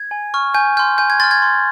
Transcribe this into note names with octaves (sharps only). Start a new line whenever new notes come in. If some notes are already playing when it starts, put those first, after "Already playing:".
Already playing: G#6
G#5
C#6 F6
G#5 G6
C6 F6 G6
G#5 G6
G#6
C6 F6 A6
G#6
C6